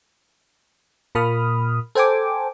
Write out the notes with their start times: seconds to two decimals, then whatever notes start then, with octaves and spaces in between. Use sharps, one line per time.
1.15 A#2 A#3 B5 D#6 F6
1.95 A4 C5 G5 G#5 D6